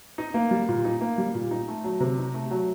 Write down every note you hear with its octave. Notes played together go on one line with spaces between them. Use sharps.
D#4
A#3
G3
A#2
D#4
A#3
G3
A#2
D#4
A3
F#3
C3
D#4
A3
F#3